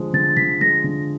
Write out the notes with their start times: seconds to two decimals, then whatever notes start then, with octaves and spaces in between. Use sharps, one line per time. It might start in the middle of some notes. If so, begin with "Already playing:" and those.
Already playing: D3 F3 G#3
0.14 D3 A6
0.37 D3 B6
0.61 G#3 A#6
0.84 D3